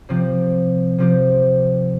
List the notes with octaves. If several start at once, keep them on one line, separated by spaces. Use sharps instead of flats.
C3 F3 C4 G4
C3 F3 C4 G4